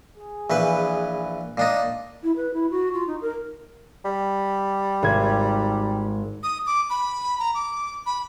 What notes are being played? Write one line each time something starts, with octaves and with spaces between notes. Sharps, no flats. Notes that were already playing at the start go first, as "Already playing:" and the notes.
G#4
A#1 E3 B4
A#2 D4 D#4
E4
B4
E4
F#4
F4
D#4
A#4
G3
G#1 G#6
D#6
D6
B5
A#5
D6
B5